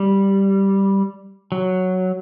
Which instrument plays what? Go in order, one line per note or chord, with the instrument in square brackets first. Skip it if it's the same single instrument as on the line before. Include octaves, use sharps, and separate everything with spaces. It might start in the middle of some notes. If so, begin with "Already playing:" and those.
Already playing: [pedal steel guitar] G3
F#3